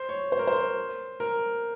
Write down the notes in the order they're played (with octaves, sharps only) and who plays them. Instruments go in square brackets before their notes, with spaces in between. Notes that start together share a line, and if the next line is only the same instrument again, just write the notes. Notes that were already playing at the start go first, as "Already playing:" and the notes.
Already playing: [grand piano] C5
C#5
C5
A#4
C5
A#4